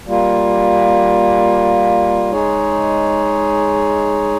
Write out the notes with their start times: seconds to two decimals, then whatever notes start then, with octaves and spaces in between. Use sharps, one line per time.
0.07 G3 A#3 F4
2.32 G#3 D#4 G#4 C#5